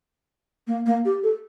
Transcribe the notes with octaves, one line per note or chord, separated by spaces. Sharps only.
A#3
A#3
G4
A4